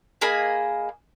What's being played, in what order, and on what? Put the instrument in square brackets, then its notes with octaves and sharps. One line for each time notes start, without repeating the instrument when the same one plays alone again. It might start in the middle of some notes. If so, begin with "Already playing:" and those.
[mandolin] A#3 G#4 D#5 B5